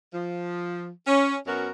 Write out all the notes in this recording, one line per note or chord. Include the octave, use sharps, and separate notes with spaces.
F3
C#4
F#2 B3 C#4 F#4 A#4